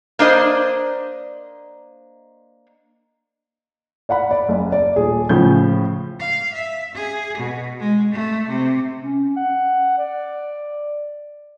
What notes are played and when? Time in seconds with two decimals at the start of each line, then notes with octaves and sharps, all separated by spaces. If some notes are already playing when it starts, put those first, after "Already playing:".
0.19 A#3 D4 C5 D#5
4.09 D5 F5 F#5 B5
4.31 D5
4.49 F#1
4.72 D5
4.96 D#1 G#4
5.29 A2 C#3 F3 G6
6.20 F5
6.53 E5
6.95 G#4
7.37 B2
7.80 G#3
8.12 A3
8.48 C3
9.01 C#4
9.37 F#5
9.98 D5